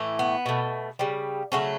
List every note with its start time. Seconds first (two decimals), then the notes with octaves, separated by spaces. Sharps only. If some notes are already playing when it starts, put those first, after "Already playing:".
Already playing: A2 E3 A3
0.19 B3
0.46 B2 A3
0.99 C#3 G3
1.52 C#3 F#3 A3 C#4